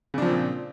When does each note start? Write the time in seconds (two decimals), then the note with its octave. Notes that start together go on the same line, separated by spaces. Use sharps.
0.14 C#3
0.18 D4
0.22 F3
0.26 C4
0.30 A#2